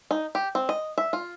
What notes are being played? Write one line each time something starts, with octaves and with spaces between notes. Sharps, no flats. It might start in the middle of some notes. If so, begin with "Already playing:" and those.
D#4
G4
C4
D#5
E5
F4